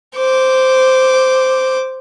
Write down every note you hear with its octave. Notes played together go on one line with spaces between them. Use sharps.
C5 D6